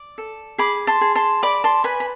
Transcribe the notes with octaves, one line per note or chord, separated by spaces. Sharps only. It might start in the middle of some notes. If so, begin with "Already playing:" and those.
Already playing: D5
A4
G#4 B5 D6
A5 C6
G#4
A5 C6
D5 B5 D6
A5 C6
B4 G#5 B5
B5